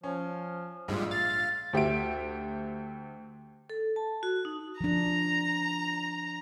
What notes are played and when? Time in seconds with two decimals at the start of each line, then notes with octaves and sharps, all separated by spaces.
0.04 F3 C#4
0.88 A#1 G#2 G3 G#3 F4
1.11 F5 A6
1.73 D2 G4 E5 D7
3.70 A4
3.96 A5
4.23 F#4
4.45 D#4
4.81 F3 D4 A#5